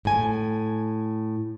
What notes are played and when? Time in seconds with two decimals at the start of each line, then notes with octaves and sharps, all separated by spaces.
0.05 A2 G#5